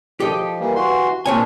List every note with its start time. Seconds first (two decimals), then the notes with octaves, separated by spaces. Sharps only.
0.20 F3 G4 A4 D#5
0.60 E3 G3 A#3
0.75 E3 F#4 C6
1.26 A#2 C4 D4 C#5 G#5